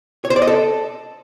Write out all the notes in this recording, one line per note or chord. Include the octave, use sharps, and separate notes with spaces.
C#5
C5
D5
D#5
A4